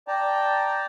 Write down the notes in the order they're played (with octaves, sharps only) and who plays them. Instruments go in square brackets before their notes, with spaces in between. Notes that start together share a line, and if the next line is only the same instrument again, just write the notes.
[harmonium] D5 G5 A5 A#5